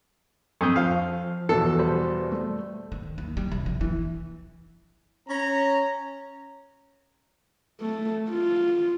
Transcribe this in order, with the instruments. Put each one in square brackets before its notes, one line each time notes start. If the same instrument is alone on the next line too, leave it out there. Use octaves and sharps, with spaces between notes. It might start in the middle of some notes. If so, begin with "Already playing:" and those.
[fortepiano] F2 [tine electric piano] C#6 D#6 G6
[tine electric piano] F3 [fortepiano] F5
[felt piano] E2 B2 E3 [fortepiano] A4
[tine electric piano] G3 C5
[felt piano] A3
[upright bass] D#3
D#2
G3
C3
F3
E3
[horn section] C#4 A#5
[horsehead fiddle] A3
F4